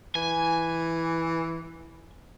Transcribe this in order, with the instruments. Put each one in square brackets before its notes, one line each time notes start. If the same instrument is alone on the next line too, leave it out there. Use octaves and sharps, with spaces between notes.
[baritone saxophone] E3 [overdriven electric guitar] G#5